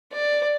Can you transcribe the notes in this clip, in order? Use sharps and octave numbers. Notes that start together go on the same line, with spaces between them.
D5